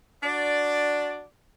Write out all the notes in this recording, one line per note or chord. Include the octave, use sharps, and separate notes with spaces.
D4 F#4 D5